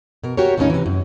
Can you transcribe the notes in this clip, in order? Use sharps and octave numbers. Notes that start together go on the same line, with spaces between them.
B2 A#4
F#4 G4 A#4 C#5
D#2 A2 D#3 G3 C#4 D#4
C3 E3
F#2